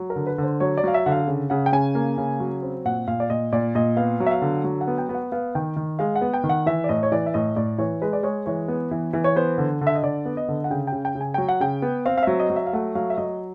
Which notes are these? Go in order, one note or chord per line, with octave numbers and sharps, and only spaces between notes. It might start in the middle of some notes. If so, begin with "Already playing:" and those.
Already playing: F#3
A#4
D3
B4
D3
C5
F#3 C#5
D5
F#3 F5
E5
D3 F#5
F5
C#3
C#3 F#5
G5
C#3 G#5
A#3
C#3
F#3
C4
A#2 F#5
A#2 F5
D5
A#2 D#5
A#2 D5
A#2 D#5
B3 F5
F#3
E5
F5
D3
F#3
F#5
B3
G5
B3
F#5
B3 F5
D#3 G5
D#3
G#3 F5
F#5
B3
G5
D#3
F#5
E3 E5
D5
A2 D#5
C#5
E3 D5
E5
A2 D#5
A2 D5
E3 C#5
G#3 B4
D5
G#3 C#5
E3 C#5
B3
E3
E3
C#5
B3 C5
D3
D3
E5
D#5
D3 D5
B3
D#5
D3
F#5
C#3 G5
G5
C#3
G5
C#3
G#5
F#3 G5
F#5
C#3 G5
B3
C4 F5
F5
F#3 E5
D#5
F#3
E5
F5
A3 F#5
F#3 F5
E5
F#3 D#5